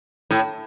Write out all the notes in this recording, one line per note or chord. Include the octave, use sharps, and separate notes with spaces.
A2